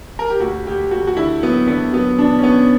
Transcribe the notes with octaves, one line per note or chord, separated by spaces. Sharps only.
A#4
G4
D2 F#4
D2 G4
D2 F#4
F#4
D3 E4
F#3 B3
D3 B3
F#3 B3
B2 D4
C#4
B2 B3